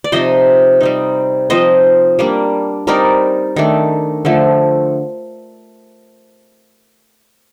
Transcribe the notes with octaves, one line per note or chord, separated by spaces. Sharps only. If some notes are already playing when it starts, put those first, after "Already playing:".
D5
C3 F3 C4 D#4 C5 D#5
G3 C4 D#4
F3 C4 D#4 C5 D#5
G3 A#3 D4
G3 C4 D#4 A#4 D5
D#3 A3 D4
D3 F3 A3